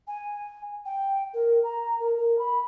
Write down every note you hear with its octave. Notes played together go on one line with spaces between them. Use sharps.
G#5
G5
A#4
A#5
A#4
A#4
B5